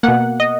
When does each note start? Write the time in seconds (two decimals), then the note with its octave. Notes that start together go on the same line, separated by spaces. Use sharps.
0.03 B2 A#3 F#5
0.40 D#5